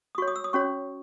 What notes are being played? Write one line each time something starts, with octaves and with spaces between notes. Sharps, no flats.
D#6
F#4 C#5 C#6
D#6
E6
D#6
C#4 F#4 C#5 C#6